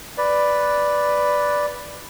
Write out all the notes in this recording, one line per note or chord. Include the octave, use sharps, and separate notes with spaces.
B4 D5